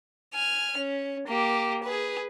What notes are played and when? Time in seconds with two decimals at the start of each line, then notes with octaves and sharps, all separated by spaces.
0.34 G#5 F6
0.77 C#4
1.27 A#3 G4
1.84 G#4 B4